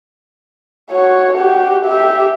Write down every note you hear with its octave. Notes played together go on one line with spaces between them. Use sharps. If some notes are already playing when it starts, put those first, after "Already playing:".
F#4 C#5
F#4 G4
G4 E5